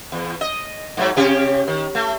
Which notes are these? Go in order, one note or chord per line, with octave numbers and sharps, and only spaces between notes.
E2
D#5
G#2 E3 F#3
C3 C#4 G4
D#3
A3